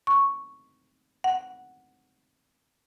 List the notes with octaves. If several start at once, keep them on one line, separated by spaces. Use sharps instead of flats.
C#6
F#5